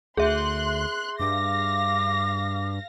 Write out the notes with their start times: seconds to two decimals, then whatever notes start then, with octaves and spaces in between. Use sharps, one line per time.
0.17 D2 G#4 E5 C6 F#6
1.20 G2 F5 D6 A#6